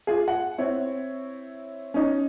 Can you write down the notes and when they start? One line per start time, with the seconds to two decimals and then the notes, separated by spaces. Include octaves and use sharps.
0.07 F4 G#4
0.28 F#5
0.58 C4 E4 C#5
1.94 C#4 D#4